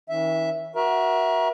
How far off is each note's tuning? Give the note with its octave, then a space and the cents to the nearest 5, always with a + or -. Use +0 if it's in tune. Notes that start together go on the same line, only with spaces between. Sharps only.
E3 -45 C#4 +0 E5 +0
F#4 +0 A#4 +35 E5 +0